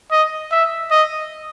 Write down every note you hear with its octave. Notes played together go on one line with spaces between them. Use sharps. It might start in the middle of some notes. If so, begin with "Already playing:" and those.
D#5
E5
D#5